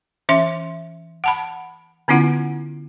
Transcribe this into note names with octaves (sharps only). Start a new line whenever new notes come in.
E3 C#4 E5 C6
F#5 A5 B5
D3 B3 C#4 E4 F4 F#5